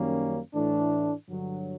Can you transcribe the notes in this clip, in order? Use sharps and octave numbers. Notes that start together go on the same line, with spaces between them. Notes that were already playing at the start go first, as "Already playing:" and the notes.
Already playing: F#2 D#3 G3 A#3 C#4
A2 E3 A3 D4
G2 D3 F#3